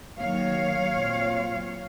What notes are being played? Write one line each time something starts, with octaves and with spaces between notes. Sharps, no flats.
D#3 F#3 A#3 C#5 F5
A#2 F#3 C4 F4